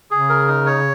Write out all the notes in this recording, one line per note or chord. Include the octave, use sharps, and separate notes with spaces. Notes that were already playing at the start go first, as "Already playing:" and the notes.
C#3 G#4
A#4
D#4
C#5